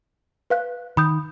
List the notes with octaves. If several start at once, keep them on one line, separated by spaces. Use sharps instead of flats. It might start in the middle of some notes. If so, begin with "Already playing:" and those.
B4 F5 F#6
D#3 B5 D#6 G6